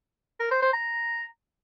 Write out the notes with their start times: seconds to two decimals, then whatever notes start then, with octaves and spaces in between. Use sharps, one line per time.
0.40 A#4
0.51 C5
0.62 C5
0.73 A#5